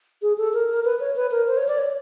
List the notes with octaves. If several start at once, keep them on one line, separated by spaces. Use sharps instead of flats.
G#4
A4
A#4
A#4
B4
C#5
B4
A#4
C5
C#5
D5
C#5